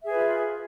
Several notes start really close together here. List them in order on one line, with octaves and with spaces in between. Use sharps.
E5 G#4 B4 F4